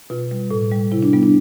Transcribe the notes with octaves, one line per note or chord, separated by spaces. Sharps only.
B2 F4
G3
A2
G3
C3 E4
D4
G3 B3
D4